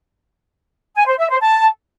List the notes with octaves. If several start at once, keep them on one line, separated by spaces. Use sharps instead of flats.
G#5
C5
E5
C5
A5